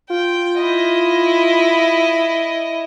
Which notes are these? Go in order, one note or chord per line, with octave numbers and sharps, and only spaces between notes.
F4 G5
E4 D#5